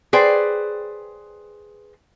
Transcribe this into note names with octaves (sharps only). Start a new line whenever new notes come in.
G#4 B4 C5 D5 G5